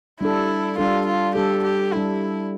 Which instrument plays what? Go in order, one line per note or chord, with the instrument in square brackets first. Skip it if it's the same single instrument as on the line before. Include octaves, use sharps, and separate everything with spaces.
[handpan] G3 D4 A4 [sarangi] E4
[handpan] G3 D4 A4 [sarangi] F4
[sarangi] F4
[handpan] G3 D4 A4 [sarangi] G4
[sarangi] G4
[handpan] G3 D4 A4 [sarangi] E4